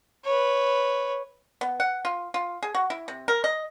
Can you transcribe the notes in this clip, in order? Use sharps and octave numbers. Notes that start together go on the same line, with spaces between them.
B4 C#5
B3
F#5
F4
F4
G#4
F#4
E4
C3
A#4
D#5